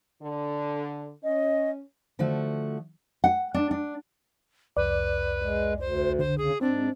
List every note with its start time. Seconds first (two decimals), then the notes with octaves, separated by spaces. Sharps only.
0.21 D3
1.24 C#4 D#5
2.19 D3 F3 A3 F#4
3.24 F#5
3.54 D4
3.71 D4
4.77 C2 F2 B4 D5
5.42 G#3
5.80 D2 C5
6.19 D3 C5
6.38 C#3 G#4
6.61 G#2 C4 D4